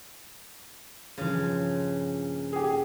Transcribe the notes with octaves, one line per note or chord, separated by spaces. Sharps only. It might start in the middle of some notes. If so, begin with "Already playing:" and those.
G2 A#2 C#3 F3
G4 G#4